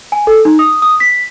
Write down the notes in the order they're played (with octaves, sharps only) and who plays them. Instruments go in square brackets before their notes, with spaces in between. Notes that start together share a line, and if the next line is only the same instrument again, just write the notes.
[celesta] G#5
A4
D#4
D#6
D#6
B6